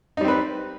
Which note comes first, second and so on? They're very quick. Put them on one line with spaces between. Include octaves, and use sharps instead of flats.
D#4 G3 C4 B4